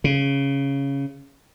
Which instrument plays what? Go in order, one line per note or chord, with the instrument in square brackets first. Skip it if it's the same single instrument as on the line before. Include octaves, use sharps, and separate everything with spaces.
[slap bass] C#3